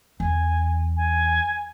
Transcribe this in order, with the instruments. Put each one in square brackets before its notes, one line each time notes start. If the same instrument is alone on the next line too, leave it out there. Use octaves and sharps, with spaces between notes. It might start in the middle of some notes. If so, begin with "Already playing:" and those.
[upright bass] E2 [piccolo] G#5
[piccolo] G#5